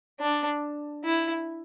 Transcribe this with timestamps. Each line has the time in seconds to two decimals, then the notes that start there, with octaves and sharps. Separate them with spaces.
0.20 D4
1.04 E4